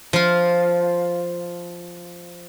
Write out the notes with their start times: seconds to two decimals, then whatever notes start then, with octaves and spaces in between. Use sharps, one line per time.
0.13 F3 F4